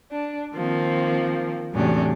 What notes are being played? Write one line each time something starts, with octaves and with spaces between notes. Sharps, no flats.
D4
D#3 F3 A#3 C4
E2 A2 C3 F#3 C#4 D4